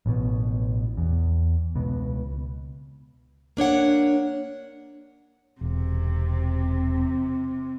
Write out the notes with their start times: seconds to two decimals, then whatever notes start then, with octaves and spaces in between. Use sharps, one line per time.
0.06 A1 B2
0.97 E2
1.75 C#2 B2
3.57 A#3 D4 C#5 F#5
5.61 E1 C3